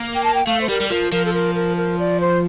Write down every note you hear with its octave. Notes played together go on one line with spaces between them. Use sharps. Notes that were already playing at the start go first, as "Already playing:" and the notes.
Already playing: A#3
G5
A5
G5
A3 F5
C5
G3 A#4
G3
F3 A#4
F3 A#4
A4
A#4
A#4
A#4
D5
C5